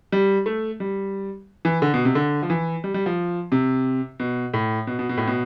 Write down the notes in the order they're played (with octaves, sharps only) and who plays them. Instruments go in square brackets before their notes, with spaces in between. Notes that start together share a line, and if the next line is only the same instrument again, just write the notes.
[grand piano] G3
A3
G3
E3
D3
B2
C3
D3
F3
E3
G3
G3
F3
C3
B2
A2
B2
B2
B2
A2
B2